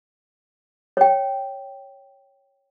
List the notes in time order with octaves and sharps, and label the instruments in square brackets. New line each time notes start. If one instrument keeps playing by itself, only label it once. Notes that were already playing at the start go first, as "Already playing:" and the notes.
[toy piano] C#5 G5